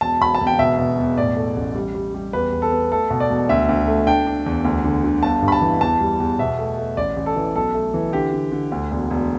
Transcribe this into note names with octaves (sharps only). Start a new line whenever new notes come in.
E1 A5
E1 B5
A5
E1
G5
B2 E5
B2
E2
A2 D5
A3
A1
G3
G3
G3
E2 B4
E2
A4
B3
A3 A4
B2
D5
E1
D2 E5
D2
A3
D4 G5
D4
E2
D2
D3
D3
G1 A5
G2
B5
A5
E3
E2 A5
G3
E2
B2 E5
A3
A3
A1 D5
A1
A4
E3
B1 A4
A3
E3
D3 G4
D3
D3
D2
E1
E1